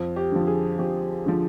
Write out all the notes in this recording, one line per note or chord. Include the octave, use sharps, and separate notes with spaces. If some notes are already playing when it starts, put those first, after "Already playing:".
Already playing: F2
G4
D3 F3
G#4
F2 G4
D3 F3